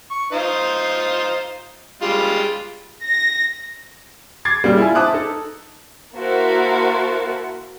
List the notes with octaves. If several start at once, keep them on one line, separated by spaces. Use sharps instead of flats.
C#6
D#4 F4 C5
G3 G#3 F4
A#6
D6 G#6 A6 C7
A#2 C#3 G3
E4 F4 G#5
C5 E5 A5 D6 D#6 F#6
D#4 A4
A#3 E4 F#4 A#4 C5 A5